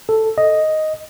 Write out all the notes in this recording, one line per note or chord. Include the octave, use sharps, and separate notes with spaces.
A4
D#5